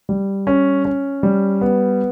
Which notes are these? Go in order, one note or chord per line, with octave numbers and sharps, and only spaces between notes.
G3
C#4
C#4
G3
B3